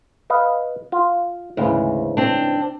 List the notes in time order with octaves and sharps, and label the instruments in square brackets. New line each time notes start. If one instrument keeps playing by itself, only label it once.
[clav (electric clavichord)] B4 D#5 F5
F4
[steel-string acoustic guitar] D2 [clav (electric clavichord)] G#2 C#3 E3
[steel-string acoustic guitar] C4 D4